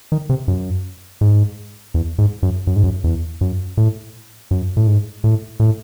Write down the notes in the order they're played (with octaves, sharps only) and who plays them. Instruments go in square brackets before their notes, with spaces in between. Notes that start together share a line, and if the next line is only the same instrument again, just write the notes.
[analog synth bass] D#3
C3
F#2
G#2
E2
G#2
F#2
F#2
G#2
F#2
E2
F#2
A2
F#2
A2
G#2
A2
A2